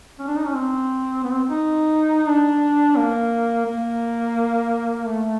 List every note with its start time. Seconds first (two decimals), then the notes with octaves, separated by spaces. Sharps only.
0.19 C#4
0.28 D4
0.36 D#4
0.46 C#4
0.54 C4
1.24 B3
1.33 C4
1.50 D#4
2.28 D4
2.97 A#3
3.66 A#3
5.05 A3